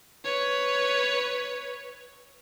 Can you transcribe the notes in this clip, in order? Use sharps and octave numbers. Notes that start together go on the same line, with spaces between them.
B4 C#5